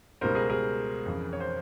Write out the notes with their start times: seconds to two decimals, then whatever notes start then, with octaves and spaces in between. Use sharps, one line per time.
0.21 C#2 B2 G3 A#4 C5
0.35 G#4 A#4
0.50 G#4 A#4
1.06 F2 C#3 E3
1.33 C#5
1.40 C5